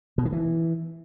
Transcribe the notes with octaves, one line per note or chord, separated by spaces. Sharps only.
B2
D#3
E3